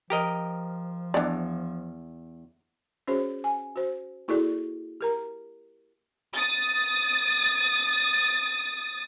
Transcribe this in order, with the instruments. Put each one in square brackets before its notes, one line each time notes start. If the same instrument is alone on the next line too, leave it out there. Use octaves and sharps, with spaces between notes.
[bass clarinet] F3 [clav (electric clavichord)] G4 A#4 D#5
[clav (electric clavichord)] E2 [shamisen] D4 D5
[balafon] C#4 F#4 G#4 C5 C#5
G#5
F#4 C5
A#3 E4 F#4 G#4 A4 D5
G4 A#4 A#5
[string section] D#6 A6